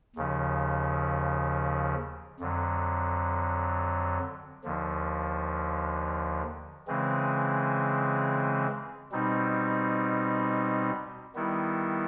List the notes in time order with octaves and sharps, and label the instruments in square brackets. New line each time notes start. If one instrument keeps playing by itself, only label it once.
[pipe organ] D#2 C#3 F3
F2 D3 F#3
D#2 D3 F3
C#3 E3 G#3 C4
B2 G3 C4 D#4
D#3 G3 B3 E4